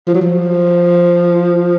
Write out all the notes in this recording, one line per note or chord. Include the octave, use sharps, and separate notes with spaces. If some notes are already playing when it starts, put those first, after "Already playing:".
F3
F#3
F3